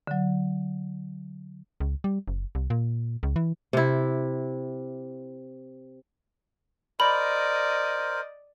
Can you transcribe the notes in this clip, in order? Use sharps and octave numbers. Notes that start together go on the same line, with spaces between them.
D3 F#3
C#2
G3
F#1
C2
A#2
C#2
E3
C3 E4
A#4 C5 D5 D#5 B5